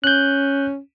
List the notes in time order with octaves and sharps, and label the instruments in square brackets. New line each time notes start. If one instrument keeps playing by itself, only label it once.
[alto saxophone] C#4 [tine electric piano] F#6 G6